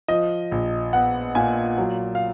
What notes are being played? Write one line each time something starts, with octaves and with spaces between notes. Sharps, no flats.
F3 D#5
A#1
B3 F#5
A#2 G#5
F#3
F5